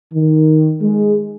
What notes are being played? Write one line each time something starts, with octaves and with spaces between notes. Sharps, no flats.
D#3
G#3